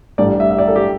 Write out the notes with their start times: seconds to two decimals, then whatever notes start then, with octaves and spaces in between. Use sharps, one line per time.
0.18 A1 G2 G3 D5
0.40 E5
0.51 E5
0.58 D5
0.68 A4
0.76 G4